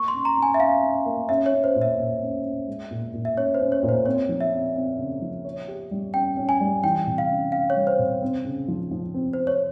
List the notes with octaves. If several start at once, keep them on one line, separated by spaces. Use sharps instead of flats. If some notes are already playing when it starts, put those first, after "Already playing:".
Already playing: A#3 C#6
C6
C#4
A#5
C#4
G#5
E5
C#4 F5
C#4
A#3
C#4 E5
C#5
C#4
C5
A#2
E5
A#2
C#4
C#4
G#3
A#2
A#2
E5
C#4 C#5
C5
C#4
C#5
A#2
C5
C4 C#5
F3
E5
C4
C4
C#3
F3
C#5
G4
G3
C#4 G5
C#4
G#5
G3
E3 G5
C3
F5
C#4
C#4 F5
C#5
G3
C5
C3
C4
C#3
F3
F3
C4
C4 C5
C#5